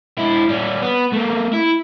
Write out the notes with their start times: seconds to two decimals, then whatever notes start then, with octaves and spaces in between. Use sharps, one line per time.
0.18 G#3 E4
0.49 G3 C#4
0.82 B3
1.13 A3 A#3
1.53 E4